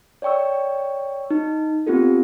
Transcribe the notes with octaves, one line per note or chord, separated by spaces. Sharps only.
C#5 D5 G5 C#6 E6
D#4
B3 C4 F4 G4 A4